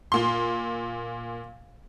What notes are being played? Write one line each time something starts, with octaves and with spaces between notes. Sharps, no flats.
A#2 C6